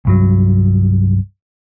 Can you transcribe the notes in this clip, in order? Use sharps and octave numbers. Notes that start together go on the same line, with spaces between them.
C2 G2 F#3